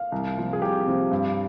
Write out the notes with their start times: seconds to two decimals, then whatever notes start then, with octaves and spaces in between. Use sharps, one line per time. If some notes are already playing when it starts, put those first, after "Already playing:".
Already playing: F5
0.12 C2
0.37 C3 F3
0.53 G#4
0.61 C2 G4
0.86 C3 F3
1.11 G2